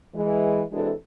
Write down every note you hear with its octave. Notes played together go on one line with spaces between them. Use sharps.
E3 G#3
C3 E3 G#3 D4 F#4 A4